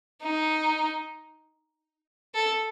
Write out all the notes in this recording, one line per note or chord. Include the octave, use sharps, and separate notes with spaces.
D#4
A4